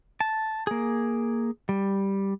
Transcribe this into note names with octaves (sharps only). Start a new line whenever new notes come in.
A5
A#3 G#4
G3